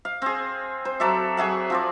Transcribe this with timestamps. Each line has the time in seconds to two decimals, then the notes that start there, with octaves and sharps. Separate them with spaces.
0.05 F5
0.22 C4 G#4
0.85 C5
1.00 F#3 A4 D5 E5
1.37 F#3 G#4 E5 F#5
1.70 F3 C4 D5